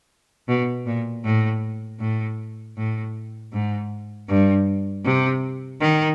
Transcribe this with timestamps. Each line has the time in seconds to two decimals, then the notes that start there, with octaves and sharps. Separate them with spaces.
0.48 B2
0.86 A#2
1.24 A2
2.00 A2
2.77 A2
3.53 G#2
4.29 G2
5.05 C3
5.81 D#3